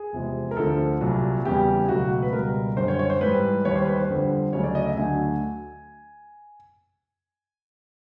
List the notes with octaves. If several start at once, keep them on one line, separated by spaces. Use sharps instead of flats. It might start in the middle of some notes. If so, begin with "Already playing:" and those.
Already playing: G#4
E2 C3 F3 G#3
A#4
D2 D3 F3 A4
C2 A#2 F#3
E2 C#3 E3 G3 G4
C#2 B2 F#3 A3 F#4
B4
C#2 B2 G3 A#4
F#2 D3 G3 C5
C#5
C#5
C5
G#2 E3 G3 B4
D#2 D#3 G3 C#5
C5
B4
C5
F2 D3 G3
D2 C#3 F#3 A3 C#5
D5
D#5
E5
D2 D3 F#3 A3 G#5